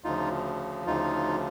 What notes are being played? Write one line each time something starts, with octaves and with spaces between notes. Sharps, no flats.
D2 C#3 F3 D#4 F4
D2 C#3 F3 D#4 F4